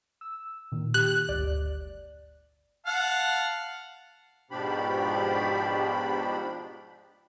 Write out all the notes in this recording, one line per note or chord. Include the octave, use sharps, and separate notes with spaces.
E6
A#2 D#3
G4 F#6
G1 D2 D5
F5 F#5 A5
G#2 B2 F3 D4 G4 B5